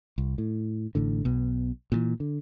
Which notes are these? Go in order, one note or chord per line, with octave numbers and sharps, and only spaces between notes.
C2
A2
A1 A2 D3
B1 B2
A#2 C#3 E3
D3